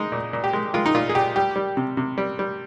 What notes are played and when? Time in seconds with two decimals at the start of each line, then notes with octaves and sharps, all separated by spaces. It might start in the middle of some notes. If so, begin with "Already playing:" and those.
Already playing: G#3 D#4
0.12 A#2
0.33 A#2
0.44 G4
0.53 G#3
0.74 G#3 F4
0.86 D#4
0.94 A#2 F4
1.09 G#4
1.15 A#2 G4
1.36 G3 G4
1.56 G3
1.77 C3
1.97 C3
2.18 G3
2.39 G3